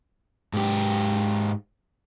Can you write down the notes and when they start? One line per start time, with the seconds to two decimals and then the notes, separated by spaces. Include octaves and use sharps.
0.53 G#2 G4